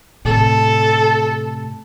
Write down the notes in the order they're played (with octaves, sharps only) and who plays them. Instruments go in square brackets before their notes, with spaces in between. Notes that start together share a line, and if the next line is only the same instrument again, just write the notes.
[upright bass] A2 C3 [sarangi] A4